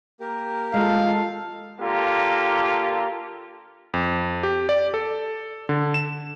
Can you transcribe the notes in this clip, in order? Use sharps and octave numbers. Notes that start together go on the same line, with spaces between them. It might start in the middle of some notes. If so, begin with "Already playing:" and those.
A#3 G4 A#4
G#3 F4 A4 F5
D3 A#3 F4 G4 A4 A#4
F2
G4
D5
A4
D3
E7